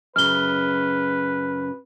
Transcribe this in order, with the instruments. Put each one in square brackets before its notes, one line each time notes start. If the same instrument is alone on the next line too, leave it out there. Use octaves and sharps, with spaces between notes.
[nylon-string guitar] F#2 C#3 [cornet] B4 [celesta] F6 G7